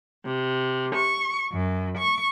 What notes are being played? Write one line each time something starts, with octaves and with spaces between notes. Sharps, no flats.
C3
C#6
F#2
C#6